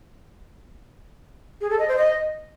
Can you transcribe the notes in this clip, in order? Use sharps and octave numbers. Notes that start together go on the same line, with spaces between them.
G#4
A4
D#5
C5
D#5